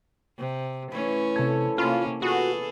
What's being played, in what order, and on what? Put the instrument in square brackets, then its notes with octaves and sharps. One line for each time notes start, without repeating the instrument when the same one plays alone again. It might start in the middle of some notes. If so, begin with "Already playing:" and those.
[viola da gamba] C3
[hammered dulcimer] E3 C#5 [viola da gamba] A3 C#4
[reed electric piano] C3 G#6 [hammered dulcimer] A4 C5 C#5
[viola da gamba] C3 A#3 C#4 [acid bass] F4 [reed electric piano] B5 F6 [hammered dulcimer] C#6
[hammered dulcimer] B3 [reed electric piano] F4 [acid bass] F#4 [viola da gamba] G#4 A4